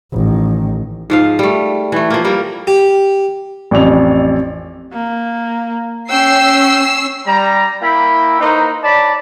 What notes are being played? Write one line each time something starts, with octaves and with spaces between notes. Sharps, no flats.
A1 D#3
G#2 F3 F5
G3 A3
E3 A3
F3 A#3
G3 A#3 A#4
G4
A1 F2 D5 F7
A#3
C#4 G5 E6 C7
G3 A#5
A#3 E4 G5 B5
A#3 D#4 B4 C5
C#5 D5 A5 B5